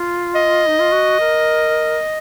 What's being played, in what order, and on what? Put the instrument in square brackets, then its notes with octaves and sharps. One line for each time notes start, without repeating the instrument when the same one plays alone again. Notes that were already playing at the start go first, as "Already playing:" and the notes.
Already playing: [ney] F4
[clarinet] D#5
[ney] D#4
F4
F#4
A#4